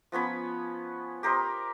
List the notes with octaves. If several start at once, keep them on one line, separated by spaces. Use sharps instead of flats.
F3 B3 C#4 B5
G4 A#4 C5 D#5